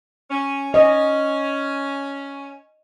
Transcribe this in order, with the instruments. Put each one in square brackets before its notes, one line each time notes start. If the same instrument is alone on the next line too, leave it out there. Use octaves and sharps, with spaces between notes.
[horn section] C#4
[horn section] C#4 [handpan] D#5